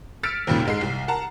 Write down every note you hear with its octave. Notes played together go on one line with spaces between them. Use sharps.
E6 F6 A6 B6 C#7 D7
G#1 D#2 A#2 C#3
G#2 G#3 C7
C2
A#4 F#5 A5 A#5